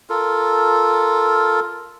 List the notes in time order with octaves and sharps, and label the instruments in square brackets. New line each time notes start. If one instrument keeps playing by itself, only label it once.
[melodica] F4 A4 A#4